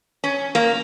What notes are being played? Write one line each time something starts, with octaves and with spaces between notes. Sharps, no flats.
C#4
A#3